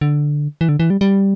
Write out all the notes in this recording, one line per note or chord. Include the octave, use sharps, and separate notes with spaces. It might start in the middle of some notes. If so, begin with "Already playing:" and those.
D3
E3
D3
E3
G3
G3